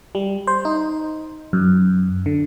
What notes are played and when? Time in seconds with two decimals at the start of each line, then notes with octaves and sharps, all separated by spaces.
0.15 G3
0.47 C5
0.65 D#4
1.53 F#2
2.26 D3